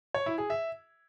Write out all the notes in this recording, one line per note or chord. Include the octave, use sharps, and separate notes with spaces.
C#5
E4
G#4
E5